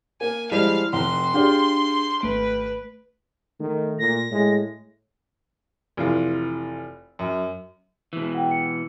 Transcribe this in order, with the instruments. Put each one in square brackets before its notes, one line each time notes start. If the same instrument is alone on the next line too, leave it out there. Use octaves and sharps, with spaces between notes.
[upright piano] A#3 [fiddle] G#5
[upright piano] F3 G3 G#3 [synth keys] E4 [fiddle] F5
[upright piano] F1 F#5 A#5 [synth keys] G5 [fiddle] C6
[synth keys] D4 G#4 [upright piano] F4 G4 D5
[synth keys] G#1 A3 D7 [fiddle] B4
[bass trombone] D#3 [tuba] A3
[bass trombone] A#2 [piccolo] A#6
[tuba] A2 [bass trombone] G#3
[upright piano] F1 E3 F4
F#2
[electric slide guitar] B2 E3
[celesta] F#5 G5
C#7